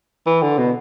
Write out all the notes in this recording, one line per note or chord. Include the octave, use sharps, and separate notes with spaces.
E3
D3
B2